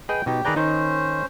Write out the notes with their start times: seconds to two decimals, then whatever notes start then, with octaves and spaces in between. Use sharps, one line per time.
0.09 G#4 B4 D#5 G5
0.26 B2 D#4 G4
0.45 D#3 G#4 B4 D5 G5 A#5
0.56 D#3 C#4 D#4 C5